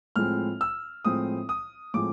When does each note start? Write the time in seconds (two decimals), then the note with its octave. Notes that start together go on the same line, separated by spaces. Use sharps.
0.16 A2 F3 G#3 C4 F6
0.61 E6
1.05 A2 F3 G#3 C4 D#6
1.49 D#6
1.94 A2 F3 G#3 C4 D6